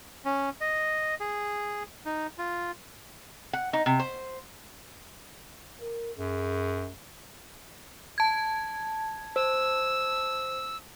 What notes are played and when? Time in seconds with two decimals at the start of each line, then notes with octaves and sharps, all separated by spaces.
0.25 C#4
0.61 D#5
1.20 G#4
2.06 D#4
2.38 F4
3.53 F#5
3.73 D#4
3.86 C3
4.00 C5
5.81 A#4
6.18 F#2 G#4
8.18 A5 G#6
9.36 C5 E6